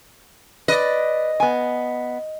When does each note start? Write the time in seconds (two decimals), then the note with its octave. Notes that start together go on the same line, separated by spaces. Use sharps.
0.68 B4 D5 D#5
1.40 B3 G#5